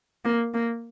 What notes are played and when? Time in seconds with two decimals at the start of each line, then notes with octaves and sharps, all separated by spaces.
0.25 A#3
0.54 A#3